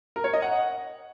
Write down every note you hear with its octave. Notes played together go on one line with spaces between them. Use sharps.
A#4
C#5
D#5
F#5